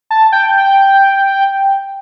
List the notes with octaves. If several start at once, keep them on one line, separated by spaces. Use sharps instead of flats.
A5
G5